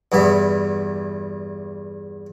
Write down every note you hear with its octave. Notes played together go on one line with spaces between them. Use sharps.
E2 G2 E3 B3